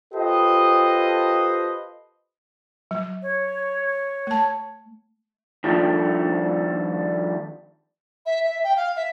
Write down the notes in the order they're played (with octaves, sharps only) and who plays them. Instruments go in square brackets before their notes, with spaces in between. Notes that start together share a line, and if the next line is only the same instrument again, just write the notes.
[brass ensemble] F4 G4 A4 B4 C5 D#5
[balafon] F#3
[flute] C#5
[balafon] A3 A5
[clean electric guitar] D#3 F3 G3 A3 D4
[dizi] E5
E5
G5
F5
E5